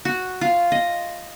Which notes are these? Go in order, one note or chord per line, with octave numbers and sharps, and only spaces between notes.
F#4
F4
D#5